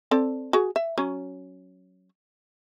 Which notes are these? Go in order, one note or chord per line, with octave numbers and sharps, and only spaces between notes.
C4 A4 D5
F#4 G#4
E5
F#3 C#4